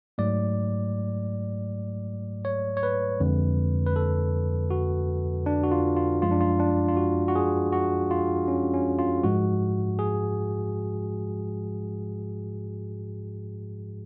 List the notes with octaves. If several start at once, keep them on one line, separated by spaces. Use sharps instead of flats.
G#2 F#3 A3 D5
C#5
C#5
B4
F2 D3 G#3
B4
A4
F#4
D4
F#4
F4
F4
F#2 F3 G#3 F4
D4
F4
D4
F4
F#4
F#4
G#4
F#4
F4
C#4
C#4
F4
G#2 F3 G#3 F#4
G#4